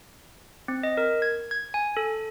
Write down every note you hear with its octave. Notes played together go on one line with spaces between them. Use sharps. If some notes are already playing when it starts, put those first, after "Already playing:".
C4
D#5
A#4
G#6
G#6
G#5
A4